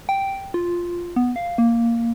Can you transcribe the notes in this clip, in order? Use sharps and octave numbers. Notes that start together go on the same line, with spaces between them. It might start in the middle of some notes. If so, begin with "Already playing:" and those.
G5
F4
B3
F5
A#3